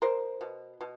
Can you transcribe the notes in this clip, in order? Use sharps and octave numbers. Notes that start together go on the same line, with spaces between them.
B2 A#4 C5
B2
B2